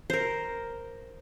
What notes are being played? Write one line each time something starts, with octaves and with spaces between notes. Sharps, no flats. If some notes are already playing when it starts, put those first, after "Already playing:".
A#4 C5